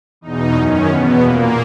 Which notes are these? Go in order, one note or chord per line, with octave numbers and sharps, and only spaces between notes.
E2 B2 D#4
F#2 D#3 C#4
E2 B2 B3
A#2 A#3